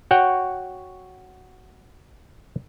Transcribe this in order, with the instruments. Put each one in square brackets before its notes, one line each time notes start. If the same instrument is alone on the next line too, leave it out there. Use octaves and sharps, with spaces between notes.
[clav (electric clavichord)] F#4 C#5 F#5 G5